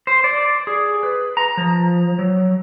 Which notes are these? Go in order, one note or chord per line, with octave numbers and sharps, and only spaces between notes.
C5
D5
G#4
B4
A#5
F3
F#3